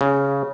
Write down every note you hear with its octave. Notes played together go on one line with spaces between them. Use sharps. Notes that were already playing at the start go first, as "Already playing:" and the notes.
C#3